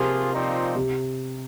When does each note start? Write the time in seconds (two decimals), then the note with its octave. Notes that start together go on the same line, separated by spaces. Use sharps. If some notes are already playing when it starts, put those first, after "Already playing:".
Already playing: C3 F3 A#3 F4 G#4
0.32 A#2 F3 C4 D#4
0.76 C3